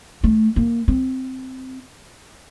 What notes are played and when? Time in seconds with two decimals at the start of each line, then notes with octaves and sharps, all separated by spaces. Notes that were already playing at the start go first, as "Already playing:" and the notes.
0.24 A3
0.56 A#3
0.88 C4